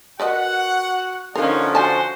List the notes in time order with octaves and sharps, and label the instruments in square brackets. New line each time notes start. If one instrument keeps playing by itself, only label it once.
[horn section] F#4 F#5 [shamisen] A#4 B4 D#5
[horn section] D3 F3 D5 [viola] C#4 D#4 [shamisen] A#4 F5
[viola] F#4 C5 [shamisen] G#5 A5